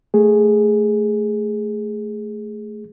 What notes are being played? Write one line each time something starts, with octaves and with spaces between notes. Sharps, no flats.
A3 G#4